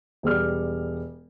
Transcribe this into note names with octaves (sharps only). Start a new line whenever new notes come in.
E1 G3 F6